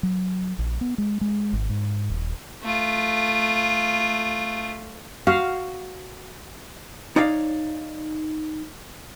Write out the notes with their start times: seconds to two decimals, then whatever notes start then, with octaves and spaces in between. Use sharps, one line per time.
0.03 F#3
0.59 A#1
0.81 B3
0.98 G#3
1.21 G#3
1.53 G#1
1.69 G#2
2.10 D#1
2.63 A3 F4
5.27 F#4 F5
7.16 D#4 C#5 D5 F5